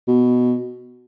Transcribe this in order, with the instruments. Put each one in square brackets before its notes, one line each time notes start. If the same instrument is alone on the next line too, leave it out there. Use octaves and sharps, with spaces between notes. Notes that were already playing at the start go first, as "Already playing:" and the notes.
[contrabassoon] B2